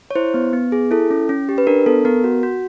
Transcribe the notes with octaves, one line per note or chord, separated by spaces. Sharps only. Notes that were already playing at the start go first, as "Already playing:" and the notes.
C#5
E4 C5
B3
B3
G#4
E4 A4
C#4
C#4
G4
B4
D4 A#4
B3 A4
B3 A#4
F#4
F#4